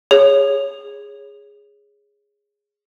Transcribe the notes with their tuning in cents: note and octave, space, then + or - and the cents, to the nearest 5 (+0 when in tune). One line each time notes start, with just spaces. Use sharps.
G#4 -10 C#5 +0